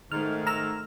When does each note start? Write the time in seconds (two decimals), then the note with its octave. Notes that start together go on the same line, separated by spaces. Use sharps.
0.12 G#2 D#3 A3 F6
0.47 A#5 E6 F6